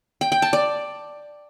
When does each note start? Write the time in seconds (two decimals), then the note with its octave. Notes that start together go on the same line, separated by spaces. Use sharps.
0.21 G5
0.32 G5
0.42 A5
0.53 D5